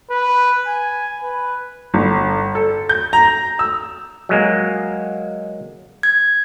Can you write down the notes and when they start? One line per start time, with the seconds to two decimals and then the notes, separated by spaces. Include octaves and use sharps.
0.11 B4
0.66 G#5
1.22 B4
1.94 G1
2.55 A4
2.89 G6
3.13 A#5
3.59 E6
4.29 F#3 G#3 A#3
6.03 G#6